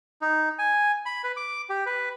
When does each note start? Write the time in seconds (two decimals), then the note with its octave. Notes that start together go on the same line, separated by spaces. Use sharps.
0.21 D#4
0.59 G#5
1.06 B5
1.24 B4
1.37 D6
1.70 G4
1.86 B4